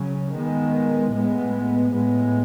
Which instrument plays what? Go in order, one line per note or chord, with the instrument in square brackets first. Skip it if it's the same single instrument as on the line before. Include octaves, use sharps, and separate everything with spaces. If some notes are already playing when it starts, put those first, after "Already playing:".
Already playing: [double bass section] C#3 F#3 C#4
D#3 G#3 B3
A2 G#3 B3
A2 G#3 B3